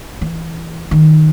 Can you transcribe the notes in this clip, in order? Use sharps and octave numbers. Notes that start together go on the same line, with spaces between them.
E3
D#3